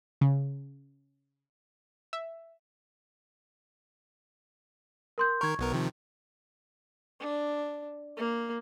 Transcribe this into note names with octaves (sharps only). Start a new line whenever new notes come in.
C#3
E5
A#4 C6 G6
D#3 A#4 C#6 G#6
B1 B3 A#4
C3 D#3 F3
D4
A#3